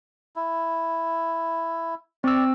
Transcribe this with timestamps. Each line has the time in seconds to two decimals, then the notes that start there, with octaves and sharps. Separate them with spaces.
0.36 E4
2.24 C4 D5 E6